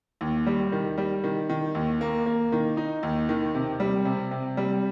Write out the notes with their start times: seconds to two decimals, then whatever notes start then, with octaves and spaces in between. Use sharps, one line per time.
0.21 D#2
0.47 G3
0.72 D#3
0.98 G3
1.24 D#3
1.49 D#3
1.75 D#2
2.01 A#3
2.26 A#3
2.52 D#3
2.77 D#4
3.03 D#2
3.29 D#3
3.54 C3
3.80 G3
4.05 C3
4.31 C3
4.57 G3